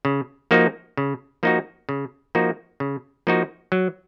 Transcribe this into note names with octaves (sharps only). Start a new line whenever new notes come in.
C#3
F3 A#3 D#4 F#4
C#3
F3 A#3 D#4 F#4
C#3
F3 A#3 D#4 F#4
C#3
F3 A#3 D#4 F#4
F#3